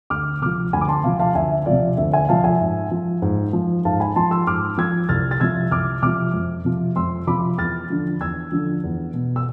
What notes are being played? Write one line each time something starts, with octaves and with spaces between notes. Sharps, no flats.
D2 D6 F6
C3 F3 D6 F6
D2 G#5 B5
D6
A5 C6
C3 F3 F5 A5
F5 A5
D2 E5 G#5
C3 F3 D5 F5
D2 E5
E5 G#5
C3 F3 F5 A5
E5 G#5
G#2
F3
G#2
F3
G#2 F5 A5
G#5 B5
F3 A5 C6
C6 E6
G#2 D6 F6
F3 E6 G#6
C2 F6 A6
A6
C3 F3 E6 G#6
C2 D6 F6
C3 F3 D6 F6
F2
C3 F3
F2 C6 E6
C3 F3 B5 D6
E2 F6 A6
D3 F3
E2 E6 G#6
D3 F3
E2
B2
E6